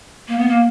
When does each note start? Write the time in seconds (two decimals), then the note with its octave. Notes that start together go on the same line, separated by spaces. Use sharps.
0.28 A#3
0.39 B3
0.48 A#3